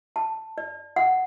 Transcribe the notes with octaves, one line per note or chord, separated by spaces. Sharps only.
A5
D5
F#5